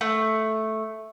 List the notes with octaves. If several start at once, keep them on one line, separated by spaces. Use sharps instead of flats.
A3